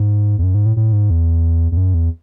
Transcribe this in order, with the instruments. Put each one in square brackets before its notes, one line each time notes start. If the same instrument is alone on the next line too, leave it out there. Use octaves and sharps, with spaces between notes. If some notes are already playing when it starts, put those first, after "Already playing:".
Already playing: [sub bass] G#2
E2
F#2
G#2
A2
A2
G#2
E2
E2
F#2
E2